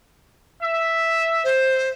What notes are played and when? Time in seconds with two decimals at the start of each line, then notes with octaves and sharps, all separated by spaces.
0.62 E5
1.44 C5